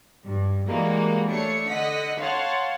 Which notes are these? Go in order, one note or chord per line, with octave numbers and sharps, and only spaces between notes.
G2
E3 G3 G#3 A#3 F#4
A3 D4 C#5 C#7
D3 D#5 F#5 B6
C#5 F5 F#5 A5 C6